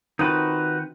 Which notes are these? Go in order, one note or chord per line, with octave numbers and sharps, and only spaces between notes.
D#3 C4 D#4 F4 F#4 B4